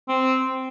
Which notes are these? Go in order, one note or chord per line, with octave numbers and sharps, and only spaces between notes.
C4